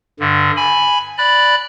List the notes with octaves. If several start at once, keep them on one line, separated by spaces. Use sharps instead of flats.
G2 D3
G#5 B5
D5 B5 F#6